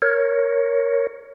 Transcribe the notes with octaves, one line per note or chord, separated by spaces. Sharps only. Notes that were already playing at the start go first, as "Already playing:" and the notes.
A#4 C#5